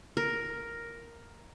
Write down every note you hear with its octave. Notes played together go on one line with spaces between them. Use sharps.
A#4